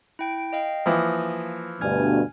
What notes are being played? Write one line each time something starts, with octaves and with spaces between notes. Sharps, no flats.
E4 G5 D7
D#5 F5 G5
E3 F3 A#3 D#6 A#6
D2 G2 B2 G#5 F6 G#6